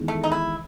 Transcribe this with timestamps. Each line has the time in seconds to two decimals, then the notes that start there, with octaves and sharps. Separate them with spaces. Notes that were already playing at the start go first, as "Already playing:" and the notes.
Already playing: E2 D#3 G#3
0.08 A3
0.23 D#4
0.32 E4